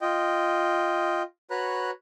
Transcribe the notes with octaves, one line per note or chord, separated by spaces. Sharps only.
F4 D#5 G5
F#4 B4 C#5 A#5 B5 F#6